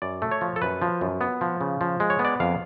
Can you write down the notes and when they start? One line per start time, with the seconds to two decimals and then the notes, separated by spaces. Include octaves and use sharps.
0.02 F#2 D5
0.22 A3
0.31 C#5
0.41 F3
0.56 A4
0.62 F#2 B4
0.82 F3
1.01 F#2
1.21 B3
1.41 F3
1.61 C#3
1.81 F3
2.00 G#3
2.10 C#5
2.19 B3
2.25 D5
2.40 F2 F5